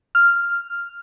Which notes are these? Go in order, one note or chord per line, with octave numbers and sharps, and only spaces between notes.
F6